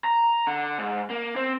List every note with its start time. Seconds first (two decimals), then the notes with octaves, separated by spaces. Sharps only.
0.04 A#5
0.47 D3
0.78 G#2
1.10 A#3
1.36 C4